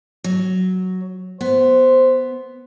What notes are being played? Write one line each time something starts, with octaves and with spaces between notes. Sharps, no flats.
F#3
B3 C5